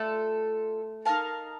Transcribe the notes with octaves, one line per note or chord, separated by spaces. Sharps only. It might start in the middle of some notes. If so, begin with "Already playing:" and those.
Already playing: A3 F4 A4 D5
D#4 A#4 F5 A5